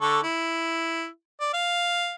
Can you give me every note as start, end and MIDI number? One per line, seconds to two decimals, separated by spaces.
0.01 0.19 50
0.01 0.19 69
0.01 0.19 85
0.23 1.07 64
1.40 1.49 74
1.54 2.15 77